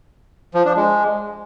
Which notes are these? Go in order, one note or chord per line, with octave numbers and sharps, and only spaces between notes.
F3
D4
G#3